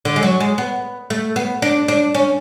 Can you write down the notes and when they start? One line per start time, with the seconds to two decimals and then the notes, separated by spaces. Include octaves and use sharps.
0.05 D3
0.16 G#3
0.23 F#3
0.40 G#3
0.58 B3
1.10 A3
1.36 B3
1.62 D4
1.88 D4
2.15 C#4